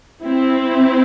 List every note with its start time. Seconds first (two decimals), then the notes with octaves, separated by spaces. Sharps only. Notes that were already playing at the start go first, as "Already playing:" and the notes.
0.23 C4 E4